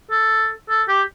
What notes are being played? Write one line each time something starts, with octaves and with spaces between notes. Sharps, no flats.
A4
A4
G4